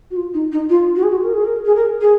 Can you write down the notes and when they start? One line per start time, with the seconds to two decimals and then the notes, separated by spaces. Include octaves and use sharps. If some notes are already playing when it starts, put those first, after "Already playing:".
0.10 F#4
0.16 F4
0.34 D#4
0.52 D#4
0.69 F4
0.96 F#4
1.03 G#4
1.11 F#4
1.22 A#4
1.34 G#4
1.45 A#4
1.65 G#4
1.75 A#4
2.01 G#4